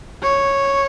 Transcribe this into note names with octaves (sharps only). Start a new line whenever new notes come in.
C#5